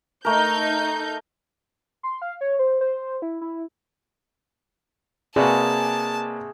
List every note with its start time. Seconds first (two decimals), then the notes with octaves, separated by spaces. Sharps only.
0.25 A3 D#4 A#4 G6
2.03 C6
2.22 F5
2.41 C#5
2.59 C5
2.81 C5
3.22 E4
3.41 E4
5.36 C3 A#3 F#4 G#4 B4 D5 A5